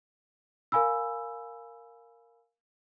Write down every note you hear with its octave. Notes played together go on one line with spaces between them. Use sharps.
A#4 F5 G#5 B5 E6